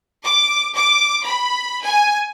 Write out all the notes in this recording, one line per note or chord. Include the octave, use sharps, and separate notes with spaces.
D6
D6
B5
G#5